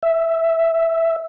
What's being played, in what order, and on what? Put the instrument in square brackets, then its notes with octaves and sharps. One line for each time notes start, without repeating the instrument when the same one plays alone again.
[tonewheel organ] E5